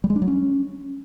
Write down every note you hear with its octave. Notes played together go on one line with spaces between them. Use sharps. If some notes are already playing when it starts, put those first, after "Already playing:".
G3
G#3
D4
F#3
C#4